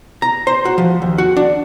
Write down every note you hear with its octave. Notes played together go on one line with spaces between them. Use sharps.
A#5
C5
F#4
F3
D#2
F#4
D4